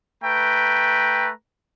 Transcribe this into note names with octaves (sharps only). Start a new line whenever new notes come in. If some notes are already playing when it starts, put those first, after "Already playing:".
A3 B4 G5 A#5